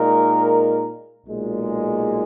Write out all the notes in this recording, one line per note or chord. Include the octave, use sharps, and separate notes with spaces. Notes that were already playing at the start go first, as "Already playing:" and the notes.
Already playing: A#2 G#3 D#4 A#4
B1 A#2 G#3